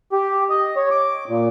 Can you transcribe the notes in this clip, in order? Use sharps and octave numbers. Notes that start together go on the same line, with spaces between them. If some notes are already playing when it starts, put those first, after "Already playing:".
G4
D#5
C#5
D6
A#2